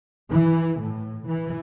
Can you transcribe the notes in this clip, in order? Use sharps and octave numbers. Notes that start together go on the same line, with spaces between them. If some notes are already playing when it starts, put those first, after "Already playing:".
E3
A2
E3